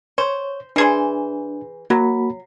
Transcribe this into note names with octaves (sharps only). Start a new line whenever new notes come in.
C5 C#5
E3 D4 G#4 C5
F#3 A#3 F#4 B5